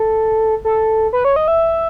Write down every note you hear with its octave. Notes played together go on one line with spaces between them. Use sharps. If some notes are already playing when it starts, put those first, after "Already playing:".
Already playing: A4
A4
B4
C#5
D#5
E5